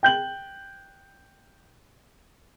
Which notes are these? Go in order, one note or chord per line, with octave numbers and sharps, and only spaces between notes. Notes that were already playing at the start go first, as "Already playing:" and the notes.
G5 G6 F#7